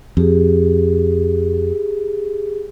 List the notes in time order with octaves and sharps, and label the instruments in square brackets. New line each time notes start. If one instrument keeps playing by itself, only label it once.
[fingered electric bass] F2 [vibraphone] G4 G#4